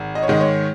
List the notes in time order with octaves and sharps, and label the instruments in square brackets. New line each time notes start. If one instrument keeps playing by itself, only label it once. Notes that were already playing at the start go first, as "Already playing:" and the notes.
Already playing: [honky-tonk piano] G#1
D#5
C#5
G#2 D#3 G#3 D#5
C#5